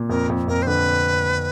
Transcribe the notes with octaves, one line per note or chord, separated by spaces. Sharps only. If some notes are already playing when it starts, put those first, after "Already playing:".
Already playing: A#2
F2 A#4
F2
F2 A#4
C5
D3 B4